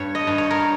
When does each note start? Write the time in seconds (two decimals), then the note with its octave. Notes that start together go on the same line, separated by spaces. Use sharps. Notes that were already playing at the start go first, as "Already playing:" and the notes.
Already playing: G2 C#5
0.15 D#5
0.27 G2
0.38 C#5
0.51 A#4